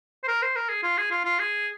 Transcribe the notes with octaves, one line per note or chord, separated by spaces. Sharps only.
C5
A#4
C5
A#4
G#4
F4
G#4
F4
F4
G#4